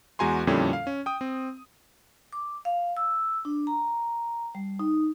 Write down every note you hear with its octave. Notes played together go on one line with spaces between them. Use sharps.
E2 G#3 F#4 G#5 A#5 C6
F2 A#2 D3 G3 C#4 E4
F5
C#4
G5 D#6
C4
D6
F5
E6
D4
A#5
G3
D#4